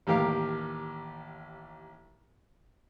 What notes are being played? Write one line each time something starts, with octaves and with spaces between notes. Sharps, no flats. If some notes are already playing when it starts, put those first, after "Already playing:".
A1 D#2 G4 A#4 F5